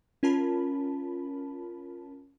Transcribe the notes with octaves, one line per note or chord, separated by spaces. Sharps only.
C#4 F4 A#4 A5 B5